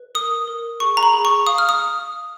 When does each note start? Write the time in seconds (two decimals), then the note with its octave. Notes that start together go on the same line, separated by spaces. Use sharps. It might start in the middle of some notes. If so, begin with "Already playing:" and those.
Already playing: B4
0.15 A#4 D#6
0.48 A#4
0.80 G#4 C#6
0.97 A#5
1.03 B5
1.13 G#4
1.25 C#6
1.47 F5 D#6
1.58 F6
1.69 D#6